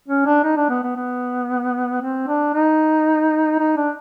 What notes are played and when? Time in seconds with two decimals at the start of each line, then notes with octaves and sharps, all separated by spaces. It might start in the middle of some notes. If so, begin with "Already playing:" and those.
0.08 C#4
0.26 D4
0.44 D#4
0.57 D4
0.70 B3
0.83 B3
0.96 B3
2.01 C4
2.27 D4
2.55 D#4
3.59 D#4
3.77 D4